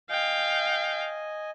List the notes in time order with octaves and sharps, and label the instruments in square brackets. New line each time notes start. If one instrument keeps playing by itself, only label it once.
[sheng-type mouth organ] D#5 G#5 [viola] F5 G5